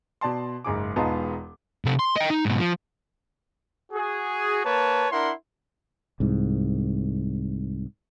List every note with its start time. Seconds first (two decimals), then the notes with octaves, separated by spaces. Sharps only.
0.21 B2 D5 A5 C6
0.64 F#1 G#2 G#4 D6
0.96 E1 G#3 B3 D#4 F4 A5
1.85 C3 A4
1.99 C6
2.16 D#5 G5
2.30 D#4
2.45 G#2 B2
2.59 F3
3.92 F#4 G#4
4.65 A#3 B4 C#5 A5
5.11 D4 E4 A#4 F#5 C6
6.20 C2 G#2